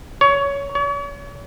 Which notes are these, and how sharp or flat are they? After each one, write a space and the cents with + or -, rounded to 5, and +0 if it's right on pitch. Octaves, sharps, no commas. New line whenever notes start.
C#5 +20
C#5 +40